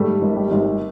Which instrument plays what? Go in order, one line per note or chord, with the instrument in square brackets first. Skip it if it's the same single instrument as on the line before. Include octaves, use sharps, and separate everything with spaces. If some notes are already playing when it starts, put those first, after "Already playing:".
Already playing: [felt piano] G#2 [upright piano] G3 A3
[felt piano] G#1
[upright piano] G3
[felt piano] G#1